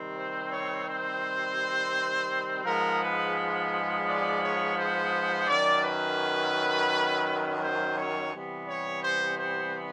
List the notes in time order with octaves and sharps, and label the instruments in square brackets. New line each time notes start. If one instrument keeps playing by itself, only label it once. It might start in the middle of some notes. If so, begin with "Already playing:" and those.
Already playing: [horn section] C3 D#3 G3 C4
C5
C#5
C5
G#2 F3 G#3 B3 A#4
B4
D5
C#5
C5
F#2 D#3 F#3 D5
B4
C5
C#5
C3 E3 G3 B3
C#5
C5
C5